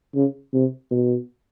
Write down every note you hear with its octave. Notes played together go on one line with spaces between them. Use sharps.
C#3
C3
B2